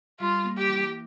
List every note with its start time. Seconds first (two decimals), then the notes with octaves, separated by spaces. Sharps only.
0.20 G3 F4
0.45 A#3
0.57 G4
0.70 E3